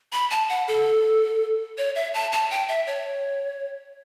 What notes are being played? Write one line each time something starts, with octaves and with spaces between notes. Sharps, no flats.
B5
A5
F#5
A4
C#5
E5
A5
A5
G5
E5
C#5